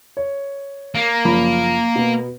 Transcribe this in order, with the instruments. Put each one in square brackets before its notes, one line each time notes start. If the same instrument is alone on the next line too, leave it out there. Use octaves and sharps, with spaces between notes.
[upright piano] C#5
[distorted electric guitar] A#3
[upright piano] F#1 F3 B5
B2 B3